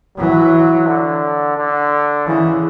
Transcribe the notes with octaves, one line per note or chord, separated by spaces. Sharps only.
E3 F#3
D3
D3
C#3 E3